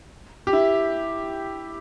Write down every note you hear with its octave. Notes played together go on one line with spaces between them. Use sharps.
G4
E4